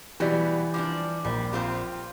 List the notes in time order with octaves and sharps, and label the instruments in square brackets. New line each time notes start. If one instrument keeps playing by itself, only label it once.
[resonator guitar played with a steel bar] B2 F#3 G3 [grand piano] E3 [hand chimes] G4 D5
[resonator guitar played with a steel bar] F3 G3 D4 [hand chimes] D6
[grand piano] A#1 [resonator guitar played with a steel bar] G3
[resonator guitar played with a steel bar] C4 F4 G4